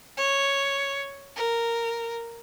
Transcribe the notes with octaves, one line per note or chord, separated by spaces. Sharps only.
C#5
A#4